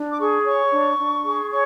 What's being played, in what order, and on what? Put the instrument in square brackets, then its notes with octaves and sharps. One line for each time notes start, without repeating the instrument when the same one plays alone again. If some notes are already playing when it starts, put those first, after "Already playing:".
Already playing: [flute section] D4
D6
G#4 C#6
C#5 C#6
D4
D4
G#4
C#5 C#6